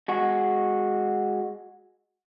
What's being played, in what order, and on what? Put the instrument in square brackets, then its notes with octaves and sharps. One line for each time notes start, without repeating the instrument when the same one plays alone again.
[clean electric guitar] G#3 F#4